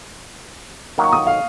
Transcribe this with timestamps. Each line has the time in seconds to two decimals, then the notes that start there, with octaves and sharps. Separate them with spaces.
0.98 D#3 F#3 A#3
1.04 C#6
1.13 D#6
1.27 F5